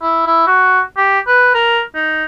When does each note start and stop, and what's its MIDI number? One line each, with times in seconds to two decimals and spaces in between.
0.02 0.23 64
0.26 0.47 64
0.47 0.81 66
0.97 1.19 67
1.27 1.51 71
1.54 1.81 70
1.95 2.25 63